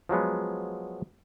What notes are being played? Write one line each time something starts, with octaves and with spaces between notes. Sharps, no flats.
F3 F#3 G#3 B3